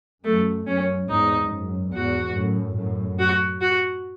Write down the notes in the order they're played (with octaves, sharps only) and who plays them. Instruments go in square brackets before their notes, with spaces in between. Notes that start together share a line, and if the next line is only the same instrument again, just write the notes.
[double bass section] F#2 [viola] A3
[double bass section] F#2 [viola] C#4
[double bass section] E2 G#2 [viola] D#4
[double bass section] F#2
[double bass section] E2 G#2 [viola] F#4
[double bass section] F#2 A2
F#2 A2
[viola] F#4
F#4